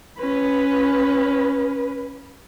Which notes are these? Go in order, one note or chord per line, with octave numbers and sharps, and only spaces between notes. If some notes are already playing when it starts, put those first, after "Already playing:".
C#4 B4